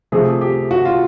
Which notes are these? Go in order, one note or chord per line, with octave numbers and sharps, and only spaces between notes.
C3 F3 A3 G#4
G4
F#4
F4